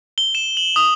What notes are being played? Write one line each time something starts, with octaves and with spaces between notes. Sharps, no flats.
G7
E7
F#7
D#6